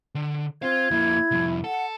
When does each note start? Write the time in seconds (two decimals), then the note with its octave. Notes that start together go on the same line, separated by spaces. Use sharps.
0.15 D3
0.62 C4 F4 F5 G#6
0.91 F2 A#3 E4
1.31 C2 F2
1.64 A4 F#5